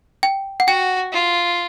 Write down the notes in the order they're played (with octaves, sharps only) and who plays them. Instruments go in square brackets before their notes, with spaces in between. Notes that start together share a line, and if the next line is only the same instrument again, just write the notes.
[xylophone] G5
F#5
[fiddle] F#4 [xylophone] G5
[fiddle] F4